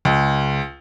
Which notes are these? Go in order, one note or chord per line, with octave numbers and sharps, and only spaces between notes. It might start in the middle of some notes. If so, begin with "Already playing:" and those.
C#2